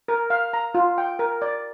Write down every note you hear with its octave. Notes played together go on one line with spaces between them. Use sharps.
A#4
F5
A#5
F4
G5
A#4
D5